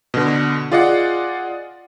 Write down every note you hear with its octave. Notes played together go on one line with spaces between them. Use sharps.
B2 D3
F4 G#4 D5 D#5 F5 F#5